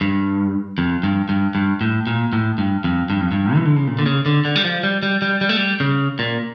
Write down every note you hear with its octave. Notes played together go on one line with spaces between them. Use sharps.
G2
F2
G2
G2
G2
A2
A#2
A2
G2
F2
G2
F2
G2
E3
D3
C#3
A#2
D3
C#3
D3
D3
G3
F3
G3
G3
G3
G3
A3
G3
C#3
A#2